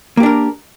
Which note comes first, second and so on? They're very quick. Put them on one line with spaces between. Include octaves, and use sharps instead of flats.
A#3 G4 D4 A#4